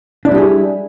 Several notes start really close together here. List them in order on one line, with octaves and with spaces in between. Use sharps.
D4 E4 G3 G4 G#4